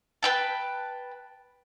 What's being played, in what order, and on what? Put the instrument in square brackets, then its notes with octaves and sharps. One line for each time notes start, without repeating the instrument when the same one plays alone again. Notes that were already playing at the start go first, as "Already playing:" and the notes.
[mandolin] B4 G5 A5